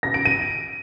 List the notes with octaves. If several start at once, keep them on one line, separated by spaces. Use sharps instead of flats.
A#6
D7
D#7